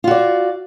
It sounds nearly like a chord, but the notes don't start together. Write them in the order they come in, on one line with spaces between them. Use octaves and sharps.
F4 F#4 D5